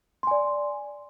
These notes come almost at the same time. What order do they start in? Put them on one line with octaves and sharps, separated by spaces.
C6 G#5 D5